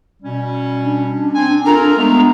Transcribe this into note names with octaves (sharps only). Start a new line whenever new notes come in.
B2 G3 C#4
D4
C4 G#5
F4 A4 A#4 A#5
G#3 A3 B3